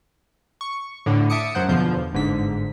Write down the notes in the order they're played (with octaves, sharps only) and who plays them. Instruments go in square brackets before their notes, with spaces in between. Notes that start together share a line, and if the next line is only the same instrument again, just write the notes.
[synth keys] C#6
A2 D3
E5 A5 D6 D#6 C#7
F#2 F#3 C5 F#5 G6
E2 B2 D3 F3 G6
G1 G#2 D3 B6